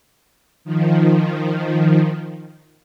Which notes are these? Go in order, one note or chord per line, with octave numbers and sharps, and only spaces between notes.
D#3 F3